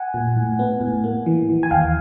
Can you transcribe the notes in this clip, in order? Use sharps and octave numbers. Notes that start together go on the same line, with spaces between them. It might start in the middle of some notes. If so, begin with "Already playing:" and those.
Already playing: F#5 G#5
A#2
A2
B3
A2
A#3
E3
E3
G#5
D#2 F5 G5